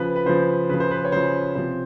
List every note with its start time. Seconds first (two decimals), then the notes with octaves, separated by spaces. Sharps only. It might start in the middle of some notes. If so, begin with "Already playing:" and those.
Already playing: C#3 F3 B4
0.16 B4
0.26 C#3 F3 C5
0.69 C#3 F3 B4
0.80 C5
0.91 B4
1.05 C#5
1.12 C#3 F3 C5
1.55 C3 F3 C5